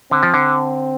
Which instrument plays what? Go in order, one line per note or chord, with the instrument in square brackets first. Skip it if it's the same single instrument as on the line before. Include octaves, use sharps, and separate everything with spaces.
[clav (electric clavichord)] D3 [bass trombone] C4
[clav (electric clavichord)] F3
D3